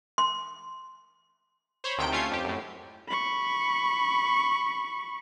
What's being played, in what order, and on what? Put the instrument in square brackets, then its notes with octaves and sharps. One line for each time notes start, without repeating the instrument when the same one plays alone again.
[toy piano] C6
[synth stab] C5 C#5 B5
D2 C3 D#3 G5 D7
A3 C#4 F4 G#6 C7
F2 G4
F#2 A2
[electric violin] B5 C#6